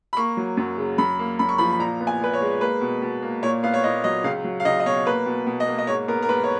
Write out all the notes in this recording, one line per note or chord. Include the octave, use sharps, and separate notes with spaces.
B5
A#3 C#6
F#3
F#2
C#3
F#2 B5
A#3
F#2 B5
C#6
F3 B5
B5
A#2 A#5
B3
G#5
A#2 B4
C#5
G#3
A#3 B4
B2
B2
A#3
A#2 C#5
B3 F5
C#5
A#2 D#5
F#3 D#5
C#2 F5
F#3
F5
C#2 D#5
D#5
B2 C#5
A#3 B4
B2
B2
D#5
A#3
D#5
G#2 C#5
B3 A#4
A#4
G#2 B4
C#5